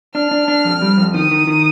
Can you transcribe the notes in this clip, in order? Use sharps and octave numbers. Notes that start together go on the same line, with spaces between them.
D4 F6
D4
D4
F2
G3
F2
D#3 D#6
D#3
D#3